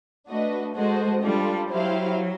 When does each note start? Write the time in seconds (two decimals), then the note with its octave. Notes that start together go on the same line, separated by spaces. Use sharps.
0.27 A3 D4 F#4 B4 D#5
0.74 G#3 F#4 A4 C5 D#5
1.22 G3 D4 F4 A4
1.70 F#3 E4 G4 C5 F5